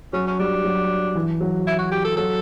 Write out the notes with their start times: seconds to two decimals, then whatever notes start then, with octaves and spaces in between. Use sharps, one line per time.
0.13 F#3 C#4
0.27 C#4
0.39 G3 D4
0.65 F#3
1.15 E3
1.40 F#3
1.67 E4
1.79 F#4
1.91 G4
2.05 A4
2.17 F#3 A4